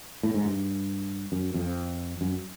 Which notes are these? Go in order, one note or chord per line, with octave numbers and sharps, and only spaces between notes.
A2
G#2
G2
F#2
F2
F#2